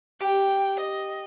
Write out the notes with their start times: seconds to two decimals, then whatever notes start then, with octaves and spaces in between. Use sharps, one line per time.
0.21 G4 G5
0.81 D#5